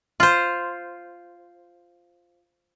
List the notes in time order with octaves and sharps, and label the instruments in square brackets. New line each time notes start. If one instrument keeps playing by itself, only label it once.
[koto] F4 C5